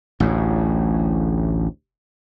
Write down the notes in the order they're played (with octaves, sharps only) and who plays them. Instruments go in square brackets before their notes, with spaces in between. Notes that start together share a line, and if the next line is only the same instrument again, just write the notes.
[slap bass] A1 D2 A2